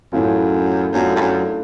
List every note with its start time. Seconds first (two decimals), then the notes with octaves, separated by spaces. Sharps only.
0.12 F#2 A2 E3 A3 C#4 F4
0.93 F#2 E3 A3 D4 F4
1.16 G2
1.20 F#2